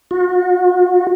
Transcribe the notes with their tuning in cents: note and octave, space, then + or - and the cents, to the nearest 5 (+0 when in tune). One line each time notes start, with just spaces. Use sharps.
F#4 -40